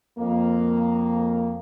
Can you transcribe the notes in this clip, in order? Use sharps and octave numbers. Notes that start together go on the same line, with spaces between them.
F2 A#3